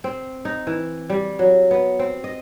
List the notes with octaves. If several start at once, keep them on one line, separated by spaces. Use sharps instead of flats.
C4
D#4
E3
G3
F#3
B3
C4
D#5